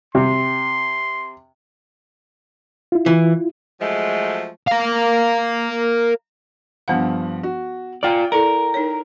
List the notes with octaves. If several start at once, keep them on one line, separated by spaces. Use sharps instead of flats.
C3 C6
E4 F4
E3
F3 F#3 G#3 A3
A#4 F5
G2 F3 B3 F5 F#5
F#4
F4 D5 G5 F6
E4 A4 A#4 D5
D#4 C#5